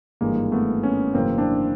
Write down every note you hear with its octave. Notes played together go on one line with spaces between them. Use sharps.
G#1 G2 E3 G#3 A#3
A3 B3
B3 C#4
G#1 F#2 C#3 E3 A#3 C4
C4 D4